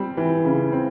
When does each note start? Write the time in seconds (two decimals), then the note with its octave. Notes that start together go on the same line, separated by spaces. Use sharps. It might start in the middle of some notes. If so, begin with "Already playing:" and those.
Already playing: G3 C4
0.17 E3
0.45 C#3
0.72 C4